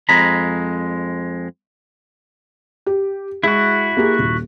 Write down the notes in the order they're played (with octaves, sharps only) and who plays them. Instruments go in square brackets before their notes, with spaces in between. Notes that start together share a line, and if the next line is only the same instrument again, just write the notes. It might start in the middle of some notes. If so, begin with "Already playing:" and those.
[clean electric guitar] F2 G#3 A#5 B5
[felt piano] G4
[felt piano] G#3 [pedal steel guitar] E4 F#4
[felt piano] A#3 G4 G#4
D#1